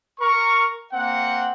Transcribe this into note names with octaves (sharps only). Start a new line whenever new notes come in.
A#4 C#6
A#3 C4 F#5